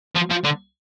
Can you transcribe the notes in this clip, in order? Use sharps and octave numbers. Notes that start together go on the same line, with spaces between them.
F3
F3
D3